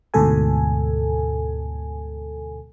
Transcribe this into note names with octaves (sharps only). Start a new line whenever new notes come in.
D2 G#2 B2 A4 G#5